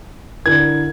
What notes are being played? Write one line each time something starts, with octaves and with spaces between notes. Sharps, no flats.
D3 E4 A#4 G#6